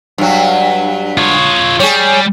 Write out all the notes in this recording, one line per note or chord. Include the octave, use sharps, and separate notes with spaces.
G2 F#3
F4 C#5
G3 G#4 C#5